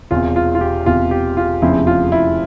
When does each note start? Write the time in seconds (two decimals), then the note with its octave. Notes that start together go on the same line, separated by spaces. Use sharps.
0.11 E1 E2 C3 F4
0.36 F4
0.55 F4
0.61 G4
0.86 E1 E2 C3 F4
1.11 G4
1.37 F4
1.62 F1 E2 C#3 F3 C4 E4
1.87 F4
2.12 E4